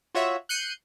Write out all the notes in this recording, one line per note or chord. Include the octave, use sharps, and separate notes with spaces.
F4 F#4 C#5 E5
F#6 G6 C7 C#7 D#7